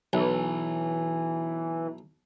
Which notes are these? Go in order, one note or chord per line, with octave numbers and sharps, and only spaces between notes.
B1 E3